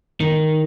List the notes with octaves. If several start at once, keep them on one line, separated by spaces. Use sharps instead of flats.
D#3